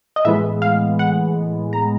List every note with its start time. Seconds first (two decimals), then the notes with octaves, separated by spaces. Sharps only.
0.16 D#5
0.25 A2 E3 G#3 B3 E5
0.62 F5
0.99 F#5
1.73 A#5